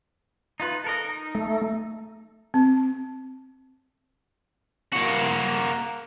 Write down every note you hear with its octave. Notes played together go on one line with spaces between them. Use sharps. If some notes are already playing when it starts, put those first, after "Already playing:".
D#4 F4 B4
A4 A#4 D#5
D#4
A3
C4
A#3 F#4